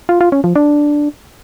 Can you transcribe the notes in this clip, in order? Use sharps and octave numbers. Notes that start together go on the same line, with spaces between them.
F4
F4
C#4
F3
D4